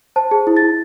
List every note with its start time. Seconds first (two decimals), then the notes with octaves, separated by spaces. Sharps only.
0.16 C5 A5
0.31 G#4
0.47 E4
0.57 A6
0.62 E4